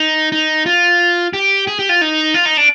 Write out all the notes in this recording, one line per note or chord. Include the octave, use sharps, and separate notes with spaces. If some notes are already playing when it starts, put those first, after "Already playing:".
Already playing: D#4
D#4
F4
G4
G#4
G4
F4
D#4
F4
D#4
D4